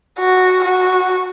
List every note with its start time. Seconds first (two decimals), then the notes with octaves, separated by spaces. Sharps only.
0.19 F#4
0.64 F#4